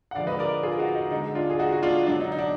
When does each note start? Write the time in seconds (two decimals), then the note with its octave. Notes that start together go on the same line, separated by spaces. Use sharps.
0.11 F#5
0.15 D3 F3 G#3 D5 F5
0.27 B4 D#5
0.39 A#4 D5
0.63 F4 G#4
0.79 D#4 F#4
0.95 D#4
1.11 D3 G#3 D#4
1.35 D4 F4
1.50 G#4
1.59 D#4 F#4
1.73 F#4
1.83 D4 F4
2.07 D3 F#3 D4
2.20 D#4
2.32 D#4
2.39 D4